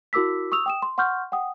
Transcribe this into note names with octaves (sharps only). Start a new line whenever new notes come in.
E4 F#4 A#4 D6 E6 B6
C#6 D#6 E6 F7
G5 D#6 E7
C6
F#5 C6 C#6 F6 G6
F#5 G5 D#6